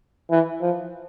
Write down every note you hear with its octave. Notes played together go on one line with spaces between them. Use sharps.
E3
F3